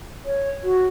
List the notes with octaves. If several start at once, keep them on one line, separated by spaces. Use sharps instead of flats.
C#5
F#4